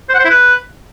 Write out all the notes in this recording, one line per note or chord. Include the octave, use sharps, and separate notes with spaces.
C5
F#5
C5
E4
B4